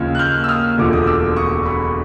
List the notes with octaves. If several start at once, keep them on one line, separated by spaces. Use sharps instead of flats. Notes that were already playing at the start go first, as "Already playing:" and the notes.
Already playing: D#2 C#3 F3 F6
F#6
F6 G6
E6
D#6 F6
E1 D2 D3 F3 D6
D#6
D6 E6
C#6 D#6
B5 C#6